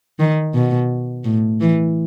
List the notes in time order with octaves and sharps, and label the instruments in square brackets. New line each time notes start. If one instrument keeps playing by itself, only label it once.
[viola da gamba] D#3
B2
A2
E3